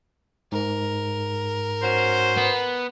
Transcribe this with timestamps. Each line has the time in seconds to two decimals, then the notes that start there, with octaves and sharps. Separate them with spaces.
0.52 G#2 A#4
1.83 C#4 F#4 C5
2.37 B3